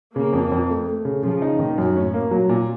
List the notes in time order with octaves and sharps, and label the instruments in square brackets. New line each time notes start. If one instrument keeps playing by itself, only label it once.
[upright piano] C#3 [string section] A#3
[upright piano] F2
F2
A3
A3
C#3
[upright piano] C#3 [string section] F3
[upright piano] D#4
[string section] A#2 [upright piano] D#3
[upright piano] F#2
[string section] A2 [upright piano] C#4
[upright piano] A#3
[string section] A#2 [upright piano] F#3
[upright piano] A#2